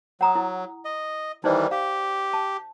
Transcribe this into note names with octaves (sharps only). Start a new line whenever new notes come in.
F#3 F#5 A#5 D#6
E4
D#5
D#3 E3 G3 D#4 C5 D5
G4 F5
A5